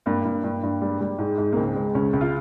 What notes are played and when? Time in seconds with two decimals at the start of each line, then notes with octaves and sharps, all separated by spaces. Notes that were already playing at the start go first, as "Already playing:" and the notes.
0.06 G2 A#3
0.25 G2
0.44 G2
0.63 G2
0.82 G3
1.01 G3
1.19 G#2
1.38 G#2
1.53 A#3
1.56 C#2 C4
1.76 G#3
1.95 C#2 C#4
2.13 C#2
2.21 F4